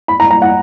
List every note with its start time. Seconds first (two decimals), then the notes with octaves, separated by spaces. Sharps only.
0.08 B5
0.20 A#5
0.31 A#5
0.42 F#5